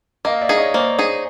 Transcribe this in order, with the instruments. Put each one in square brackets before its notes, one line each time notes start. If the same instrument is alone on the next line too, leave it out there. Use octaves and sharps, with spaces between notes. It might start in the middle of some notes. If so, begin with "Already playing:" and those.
[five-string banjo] A#3 [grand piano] D#5 F5
[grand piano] D5 E5
[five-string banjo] D#4 G#4
[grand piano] C#5 D#5
[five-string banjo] A#3 [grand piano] C5 D5
[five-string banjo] D#4 G#4